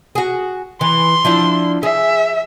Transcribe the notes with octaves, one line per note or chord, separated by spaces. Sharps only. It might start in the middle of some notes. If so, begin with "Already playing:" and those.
F#4 G#4
E3 C6
F3 D4 E4
G#4 E5